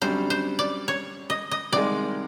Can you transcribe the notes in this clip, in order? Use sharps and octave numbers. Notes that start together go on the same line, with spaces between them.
F#2 D3 G3 C4 C5
C5
D5
C#5
D#5
D#5
C2 C3 D#3 G#3 D5